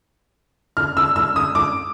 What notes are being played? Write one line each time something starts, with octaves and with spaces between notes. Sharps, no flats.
F6
E6
E6
D#6
D6